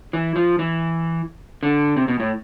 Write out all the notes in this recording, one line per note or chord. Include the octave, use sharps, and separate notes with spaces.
E3
F3
E3
D3
C3
B2
A2